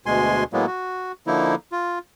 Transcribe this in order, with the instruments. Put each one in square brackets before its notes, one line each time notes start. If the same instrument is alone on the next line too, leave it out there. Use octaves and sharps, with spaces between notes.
[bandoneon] D2 B2 G#3 G#5 C6
A2 F#3 G#3 A#3 B3
F#4
D3 F3 A#3 D#4 E4
F4